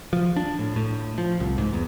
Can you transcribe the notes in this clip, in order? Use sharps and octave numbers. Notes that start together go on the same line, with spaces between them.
F3
D4
A2
A2
F3
C2
G#2
E2